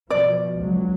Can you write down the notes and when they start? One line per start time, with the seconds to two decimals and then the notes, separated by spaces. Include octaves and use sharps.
0.10 B2 F3 D5
0.55 C#2 F#3